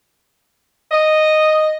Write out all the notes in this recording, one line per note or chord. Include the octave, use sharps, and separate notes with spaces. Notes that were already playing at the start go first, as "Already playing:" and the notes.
D#5